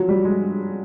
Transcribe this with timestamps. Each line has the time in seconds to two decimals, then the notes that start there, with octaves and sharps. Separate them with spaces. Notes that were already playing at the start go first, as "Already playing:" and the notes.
Already playing: F3 F#3
0.08 G3
0.25 G#3